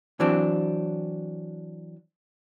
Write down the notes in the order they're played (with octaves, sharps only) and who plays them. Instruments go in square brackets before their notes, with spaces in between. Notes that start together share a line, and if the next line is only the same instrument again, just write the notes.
[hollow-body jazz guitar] E3 F#3 C4 D4